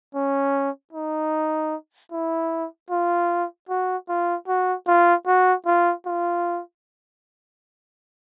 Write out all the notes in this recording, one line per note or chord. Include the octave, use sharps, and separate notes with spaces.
C#4
D#4
E4
F4
F#4
F4
F#4
F4
F#4
F4
F4